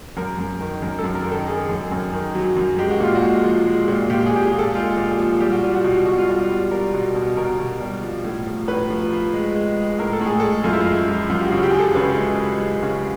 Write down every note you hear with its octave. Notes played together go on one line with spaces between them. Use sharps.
F#2 A#4
F#2
D#3
F#2 A#4
A4
F#2
A#4
D#3
A4
D#3 G#4
F#2
F#2
D#3
F#3
F#2
G#3 G4
F#4
A#2 F4
F#4
G#3
F3
G#3
A#2
A#2 G4
G#4
A#2 G4
G#4
A#2
A4
G#3 F4
A#2
F3
G3 G4
F#4
G3 F4
F#4
B2
B2 F#4
F4
G3 F#4
G3
G3 A#4
B2
B2
B2 A#4
B2
G3
F3
A2
F3
A2 B4
F3
F3
G#3
G#3
G#3
A2 A#4
A4
A2
G#4
G#3 A4
F#2 F4
E4
G#3 F4
F3
F#2 F4
G4
F#4
C#3
G4
F3 G#4
A4
C#3 B4
G#3
G#3
G#3
C#3